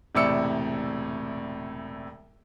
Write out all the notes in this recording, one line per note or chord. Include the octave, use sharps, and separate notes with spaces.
E1 A2 C3 D5 E6 C#7